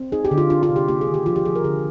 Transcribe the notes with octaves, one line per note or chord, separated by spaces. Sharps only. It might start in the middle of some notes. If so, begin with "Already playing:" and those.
Already playing: C4
D#4 G#4
G4
D3
F4
D4 F4
F4
C3
G4
A#3 G4
G#4
D#3
G4
F3 F4
G4
F3 G#4
A#4
D3 G#4